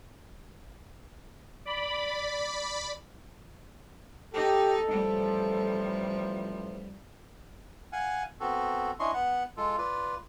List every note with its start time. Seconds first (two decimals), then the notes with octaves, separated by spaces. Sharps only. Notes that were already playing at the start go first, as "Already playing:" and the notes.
1.65 D5 B5
4.34 D#4 G4 A4
4.91 A1 F3 G3
7.92 F5 F#5 G#5
8.40 B3 C4 F#4 A4
8.99 C#4 D4 E4 D#5 C6 C#6
9.14 B3 F#5
9.57 G#3 F4 A4
9.78 F4 B4 D5